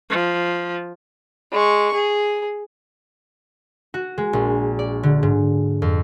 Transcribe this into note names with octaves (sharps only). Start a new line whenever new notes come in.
F3
G#3 C#6
G#4
F#4
G#3
A#1
D5
D3
G#2
F2